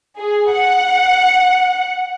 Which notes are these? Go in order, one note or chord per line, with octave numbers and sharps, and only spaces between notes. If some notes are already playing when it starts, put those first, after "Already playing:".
G#4
F#5